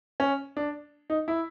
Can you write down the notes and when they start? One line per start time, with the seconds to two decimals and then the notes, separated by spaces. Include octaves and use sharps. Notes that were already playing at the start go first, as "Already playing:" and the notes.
0.20 C#4
0.57 D4
1.10 D#4
1.28 E4